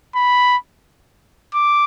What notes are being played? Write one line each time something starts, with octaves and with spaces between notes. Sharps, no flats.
B5
D6